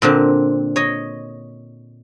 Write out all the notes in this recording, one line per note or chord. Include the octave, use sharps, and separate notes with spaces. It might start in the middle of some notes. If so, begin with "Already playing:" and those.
A#2 D3 C4
C#5 D#5